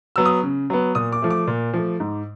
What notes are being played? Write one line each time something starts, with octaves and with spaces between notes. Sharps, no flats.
F#3 B3 E6
D#6
C#3
F#3 B3
A#2 D#6
D6
F3 A3
D6
A#2
F3 A3
G#2